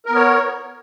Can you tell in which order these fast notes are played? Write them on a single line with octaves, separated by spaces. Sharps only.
A#4 B3 C#5